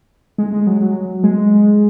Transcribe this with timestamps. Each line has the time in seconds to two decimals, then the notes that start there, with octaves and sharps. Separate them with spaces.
0.38 G#3
0.53 G#3
0.67 F#3
0.81 F#3
1.24 G#3